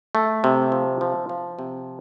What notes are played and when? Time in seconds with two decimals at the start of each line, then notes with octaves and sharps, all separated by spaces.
0.15 A3
0.44 C3
0.72 F3
1.01 F3
1.29 F3
1.59 C3